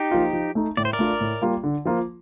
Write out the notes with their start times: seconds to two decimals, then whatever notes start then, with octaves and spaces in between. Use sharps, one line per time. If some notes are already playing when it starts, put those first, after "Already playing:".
Already playing: D#4 G4
0.11 F3 A#3 F4
0.33 F3
0.55 A3 D#4
0.77 A2 D5
0.85 C5
0.93 A#4 D5
0.99 A3 D4 F4
1.21 A2
1.42 G3 A#3 F4
1.64 D3
1.85 F3 A#3 F4